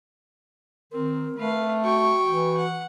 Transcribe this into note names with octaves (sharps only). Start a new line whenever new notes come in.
D#3 C4 A#4
A3 B4 F5
F#4 G5 C#6
E3
F#5